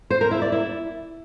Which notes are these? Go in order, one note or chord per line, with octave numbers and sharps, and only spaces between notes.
C5
A#4
E4
D5
E4